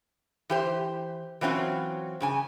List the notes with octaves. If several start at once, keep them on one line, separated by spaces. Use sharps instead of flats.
E3 G4 C5
E3 F#3 C4 C#4 F4
G2 C#3 G#5